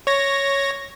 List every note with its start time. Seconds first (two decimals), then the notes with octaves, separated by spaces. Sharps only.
0.07 C#5 A#6